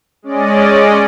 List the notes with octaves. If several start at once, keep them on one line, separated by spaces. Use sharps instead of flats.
G#3 C#4 D5 D#5